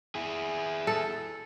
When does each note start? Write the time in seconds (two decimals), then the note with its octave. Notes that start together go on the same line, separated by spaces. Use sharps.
0.15 E4 G#4
0.87 A4